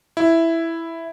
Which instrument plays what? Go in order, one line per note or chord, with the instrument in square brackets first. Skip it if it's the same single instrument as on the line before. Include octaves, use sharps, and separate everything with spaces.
[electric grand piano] E4